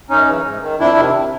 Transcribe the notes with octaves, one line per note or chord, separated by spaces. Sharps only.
F#2 C#4 D#4
C#3 E3
G#2
D#3
F2 D4 E4
C3 D#3